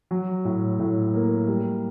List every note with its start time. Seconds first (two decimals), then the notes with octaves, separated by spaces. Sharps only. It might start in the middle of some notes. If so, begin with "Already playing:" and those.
0.11 F#3
0.45 A2
0.79 A2
1.14 A#3
1.48 G3